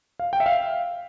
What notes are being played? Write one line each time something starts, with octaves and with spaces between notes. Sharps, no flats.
F5
G5
E5
F5